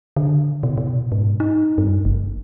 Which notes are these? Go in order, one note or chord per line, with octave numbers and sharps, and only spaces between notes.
D3
B2
B2
G#2
D#4
G2
G1